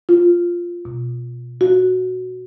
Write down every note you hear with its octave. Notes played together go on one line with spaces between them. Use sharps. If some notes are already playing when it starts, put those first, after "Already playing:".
F4
B2
F#4